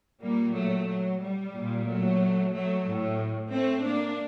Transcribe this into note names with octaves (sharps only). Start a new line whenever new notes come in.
A#2 G3 A#3
F#3 A3
F#3
G3
A#2
F#3 A3
F#3 A3
A2
A3 C4
A#3 D4